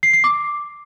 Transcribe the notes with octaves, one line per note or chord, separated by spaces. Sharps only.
C7
C7
D6